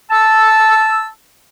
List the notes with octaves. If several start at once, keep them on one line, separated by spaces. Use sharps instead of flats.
A5 E6